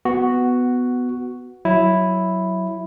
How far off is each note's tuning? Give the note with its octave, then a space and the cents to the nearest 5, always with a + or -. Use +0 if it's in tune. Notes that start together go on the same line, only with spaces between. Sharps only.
B3 +10 F#4 +0
F#3 +0 E4 +0